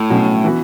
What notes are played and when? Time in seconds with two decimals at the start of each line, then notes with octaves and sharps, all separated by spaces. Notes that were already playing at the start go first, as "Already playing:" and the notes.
Already playing: A2
0.10 B2 F#3 C#4
0.44 E3 B3 F#4